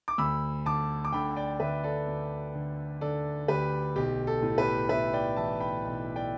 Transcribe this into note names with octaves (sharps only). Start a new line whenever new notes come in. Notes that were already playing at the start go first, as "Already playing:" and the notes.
D6
D2 B5 E6
D3 A5 D6
D6
D3 G5 B5
D5 G5
D2 B4 E5
A4 D5
D2
D3
D3 A4 D5
D2 G4 B4
B1 G4
A4
A2
G4 B4
B1 B4 E5
D5 G5
E3 E5 A5
G5 B5
B1
D5 G5